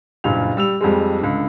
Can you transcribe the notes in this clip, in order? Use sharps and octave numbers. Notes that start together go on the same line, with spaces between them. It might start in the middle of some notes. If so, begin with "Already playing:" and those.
F#1 G2 A#2 F7
G3 E6 F7
F2 G3 G#3
C#2 D3